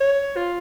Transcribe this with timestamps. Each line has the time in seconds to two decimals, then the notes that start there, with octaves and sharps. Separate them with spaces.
0.01 C#5
0.36 F4